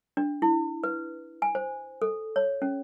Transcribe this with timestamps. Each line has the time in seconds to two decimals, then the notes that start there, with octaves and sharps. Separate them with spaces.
0.17 D4
0.42 E4
0.84 B4
1.42 G#5
1.55 C5
2.02 A4
2.36 C#5
2.62 C#4